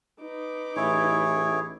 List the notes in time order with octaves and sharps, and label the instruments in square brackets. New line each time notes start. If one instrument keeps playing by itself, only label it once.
[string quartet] D#4 B4 D6
[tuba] A1 [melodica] E4 G#4 C#5